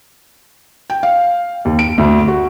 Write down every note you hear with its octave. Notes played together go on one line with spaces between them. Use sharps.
G5
F5
D#2
D7
D2
F#4